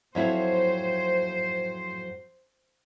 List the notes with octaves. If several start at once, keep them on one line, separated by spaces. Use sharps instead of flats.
F2 F#3 E4 C5